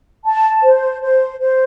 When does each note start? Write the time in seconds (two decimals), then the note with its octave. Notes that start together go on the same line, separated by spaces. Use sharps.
0.25 A5
0.63 C5
1.02 C5
1.40 C5